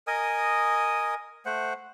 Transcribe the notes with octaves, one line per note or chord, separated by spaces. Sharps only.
A#4 D#5 G#5 D#6
A3 C5 F#5